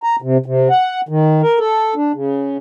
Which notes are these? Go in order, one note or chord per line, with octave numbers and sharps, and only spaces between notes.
A#5
C3
C3
F#5
D#3
A#4
A4
D4
C#3